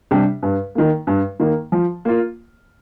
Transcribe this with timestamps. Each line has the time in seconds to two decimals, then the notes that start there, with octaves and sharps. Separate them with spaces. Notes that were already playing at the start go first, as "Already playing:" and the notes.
0.11 C3 G3 D4 G4
0.43 G2
0.75 D#3 A#3
1.07 G2
1.40 D#3 A#3
1.72 F3
2.05 A#3 F4